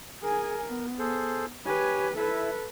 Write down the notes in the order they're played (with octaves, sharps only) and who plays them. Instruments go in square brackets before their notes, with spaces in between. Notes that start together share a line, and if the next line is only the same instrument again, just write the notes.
[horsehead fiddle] G#4 G#5 [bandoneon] A#4
[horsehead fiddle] B3
[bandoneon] G#4 A4 C5
[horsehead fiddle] G4 B4 [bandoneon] C#5 G#5
[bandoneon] E4 E5 [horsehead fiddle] A4 B4